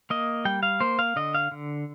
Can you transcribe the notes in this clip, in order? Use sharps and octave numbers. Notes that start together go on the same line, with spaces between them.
A#3 D#5
G3 G5
F5
A#3 C5
F5
D3 D#5
F5
D3